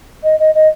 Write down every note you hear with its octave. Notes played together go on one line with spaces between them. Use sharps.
D#5
D#5
D#5